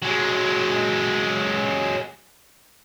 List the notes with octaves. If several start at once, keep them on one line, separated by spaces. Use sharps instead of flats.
F#3 G#3